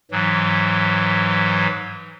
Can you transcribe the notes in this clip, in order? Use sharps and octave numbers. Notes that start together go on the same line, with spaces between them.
G#2 E3 F#3